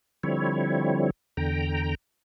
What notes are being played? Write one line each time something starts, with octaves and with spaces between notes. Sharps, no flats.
D3 F3 G3 C4 E4 C#5
E2 D3 G5 A#5